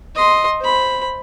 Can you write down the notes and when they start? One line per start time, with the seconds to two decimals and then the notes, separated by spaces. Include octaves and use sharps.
0.15 D#5 C6
0.61 C5 B5